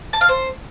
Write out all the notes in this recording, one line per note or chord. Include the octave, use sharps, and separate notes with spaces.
A5
F5
C5